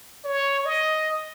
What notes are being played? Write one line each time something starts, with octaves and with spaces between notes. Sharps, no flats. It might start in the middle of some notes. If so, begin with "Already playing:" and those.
C#5
D#5